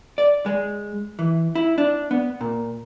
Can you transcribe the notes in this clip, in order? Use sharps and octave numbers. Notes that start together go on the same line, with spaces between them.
D5
G#3
E3
E4
D4
B3
A#2